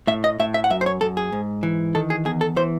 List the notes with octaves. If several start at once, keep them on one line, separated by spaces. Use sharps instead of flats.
A2 E5
D#5
A2 E5
E5
F#5
F#2 E5
C5
C#5
F#2 A4
G#4
G#2
E3
D#3 A4
G#4
E2 G#4
A4
E3 C5